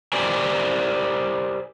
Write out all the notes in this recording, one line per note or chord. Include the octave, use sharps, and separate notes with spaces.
G4 A#4 C5 D5 G5 G#5